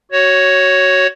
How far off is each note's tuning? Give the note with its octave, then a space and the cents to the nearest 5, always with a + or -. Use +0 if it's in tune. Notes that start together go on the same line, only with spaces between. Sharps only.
F#4 +15 C#5 +0